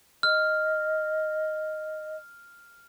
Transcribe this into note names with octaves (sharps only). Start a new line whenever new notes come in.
D#5 F6